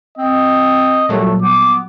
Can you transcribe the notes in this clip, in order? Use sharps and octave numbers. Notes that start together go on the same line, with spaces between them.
C4 D#5
A#2 F#3 G3 A3
B3 D6